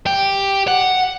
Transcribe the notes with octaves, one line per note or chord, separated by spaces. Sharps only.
G4
F#5